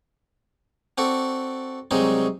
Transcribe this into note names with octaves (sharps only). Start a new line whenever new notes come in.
C4 F#4 A4 D5
C2 F#3 G#3 C4 D#4 G#4